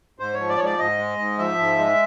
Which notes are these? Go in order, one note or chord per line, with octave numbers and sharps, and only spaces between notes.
G#2 C5
F3 C#5
D5
G#2 C#5
D5
G#2 D#5
G#3
G#2
F3 E5
G#2
G#3